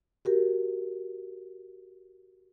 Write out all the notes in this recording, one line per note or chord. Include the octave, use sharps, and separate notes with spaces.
F#4 G4 A#4